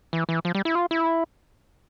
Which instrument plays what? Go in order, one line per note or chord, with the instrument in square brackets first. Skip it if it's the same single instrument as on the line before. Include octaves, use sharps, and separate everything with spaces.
[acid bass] E3
E3
F3
G3
E4
F4
E4